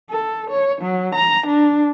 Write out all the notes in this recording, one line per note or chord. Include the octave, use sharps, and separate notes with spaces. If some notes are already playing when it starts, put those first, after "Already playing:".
A4
C#5
F#3
A#5
D4